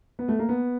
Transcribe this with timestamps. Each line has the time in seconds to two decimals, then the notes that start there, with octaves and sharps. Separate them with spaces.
0.19 B3
0.28 A3
0.39 A#3
0.49 B3